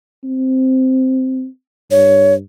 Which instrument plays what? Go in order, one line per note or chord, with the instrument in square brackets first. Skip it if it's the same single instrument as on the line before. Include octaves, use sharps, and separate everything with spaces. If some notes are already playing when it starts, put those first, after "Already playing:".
[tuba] C4
[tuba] G2 [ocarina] C#5